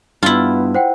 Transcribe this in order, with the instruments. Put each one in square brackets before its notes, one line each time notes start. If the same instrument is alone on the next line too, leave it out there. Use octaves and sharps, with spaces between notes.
[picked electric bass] G2 [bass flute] B3 [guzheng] E4 F4
[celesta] C5 F#5 G5